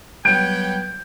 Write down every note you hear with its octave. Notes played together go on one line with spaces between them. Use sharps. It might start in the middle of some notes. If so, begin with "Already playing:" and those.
F#3 G3 B3 C#5 G5 G6 D7